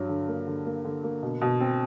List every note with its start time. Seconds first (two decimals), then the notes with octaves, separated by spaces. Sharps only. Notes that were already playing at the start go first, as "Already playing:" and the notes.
Already playing: G2 F#3
0.09 D3
0.28 A#3
0.47 D3
0.66 A#3
0.85 D3
1.03 A#3
1.22 B2
1.41 B2
1.61 C4